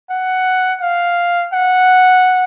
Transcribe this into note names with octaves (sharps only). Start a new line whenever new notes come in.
F#5
F5
F#5